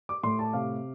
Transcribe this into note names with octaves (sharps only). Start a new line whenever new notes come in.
D6
A2 C6
A5
C3 F5